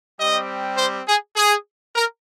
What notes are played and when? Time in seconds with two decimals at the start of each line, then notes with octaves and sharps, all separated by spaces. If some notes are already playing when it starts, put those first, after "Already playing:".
0.19 G3 C4 G4 D#5
0.77 C5
1.07 G#4
1.36 G#4
1.95 A#4